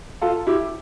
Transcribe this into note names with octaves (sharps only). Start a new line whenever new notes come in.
F4 A4
E4 G4